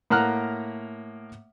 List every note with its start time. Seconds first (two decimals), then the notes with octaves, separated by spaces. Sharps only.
0.10 A2 A#3 F#5 A#5 F6 F#6